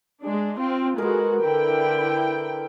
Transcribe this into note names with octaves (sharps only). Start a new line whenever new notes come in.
G#3 D4
C4 F4
G#3 F#4 A#4 B4
D3 E4 G5